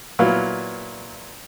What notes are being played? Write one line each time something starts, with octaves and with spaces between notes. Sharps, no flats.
A#2 F#3 B3 E4 F5